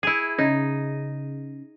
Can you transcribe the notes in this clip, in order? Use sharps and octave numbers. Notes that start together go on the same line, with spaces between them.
E4 G#4
C#3 D#4